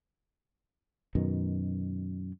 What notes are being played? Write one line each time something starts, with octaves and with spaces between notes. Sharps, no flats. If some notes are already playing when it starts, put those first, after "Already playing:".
F#2 B2 D#3